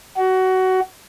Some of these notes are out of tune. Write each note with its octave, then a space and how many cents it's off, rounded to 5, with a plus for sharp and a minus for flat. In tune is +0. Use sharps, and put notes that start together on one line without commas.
F#4 +20